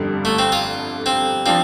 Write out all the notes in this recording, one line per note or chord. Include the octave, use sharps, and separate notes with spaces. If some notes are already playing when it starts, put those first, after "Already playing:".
Already playing: G1 F2 D3 G3
A3
C4
F4
C4
F3 C4 D4 F4